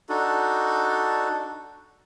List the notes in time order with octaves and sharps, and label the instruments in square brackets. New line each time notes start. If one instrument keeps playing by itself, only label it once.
[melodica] D4 D#4 F#4 A4